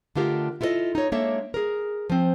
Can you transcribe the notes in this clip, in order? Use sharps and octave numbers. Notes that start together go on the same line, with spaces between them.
D3 A3 D4 F4 G4 A#4
E4 F4 A4 A#4 D#5
D#4 C#5
G#3 A#3 D4 A4 C#5 E5
G#4 A#4
F3 C4